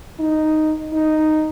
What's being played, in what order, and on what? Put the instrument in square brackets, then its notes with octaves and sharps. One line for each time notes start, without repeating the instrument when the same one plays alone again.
[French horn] D#4
D#4